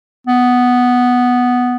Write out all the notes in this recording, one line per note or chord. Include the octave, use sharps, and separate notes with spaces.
B3